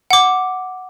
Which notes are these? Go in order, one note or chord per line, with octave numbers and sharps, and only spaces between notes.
F#5 D6